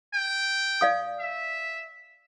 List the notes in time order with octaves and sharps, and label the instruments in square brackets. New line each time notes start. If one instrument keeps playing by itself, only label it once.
[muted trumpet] G5
[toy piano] D5 F5 D#6
[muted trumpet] E5